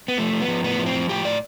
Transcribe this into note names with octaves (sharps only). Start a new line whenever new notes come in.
B3
F3 A3
F3
B3
F3
A2 B3
F3
C4
F3
A2 G4
A2 D5